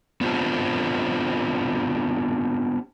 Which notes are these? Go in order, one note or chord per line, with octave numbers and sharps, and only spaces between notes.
B3 C4 D4 F4 G4